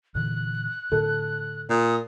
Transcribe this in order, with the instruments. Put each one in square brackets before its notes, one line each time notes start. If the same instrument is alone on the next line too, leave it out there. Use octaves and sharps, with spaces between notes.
[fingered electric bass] A#2 D3 E3 [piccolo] F#6
[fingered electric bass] A2 D3 [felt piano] A4
[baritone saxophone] A#2 [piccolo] D#6